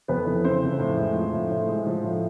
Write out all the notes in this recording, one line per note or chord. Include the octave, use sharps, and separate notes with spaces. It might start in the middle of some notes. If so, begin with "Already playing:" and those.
F2 B3 B4
E3
C#3 C4 C5
F2
A2
G#3
F3
A2
A2
G#3
F3
A2